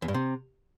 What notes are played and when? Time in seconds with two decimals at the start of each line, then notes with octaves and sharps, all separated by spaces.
0.02 E2
0.08 G2
0.14 C3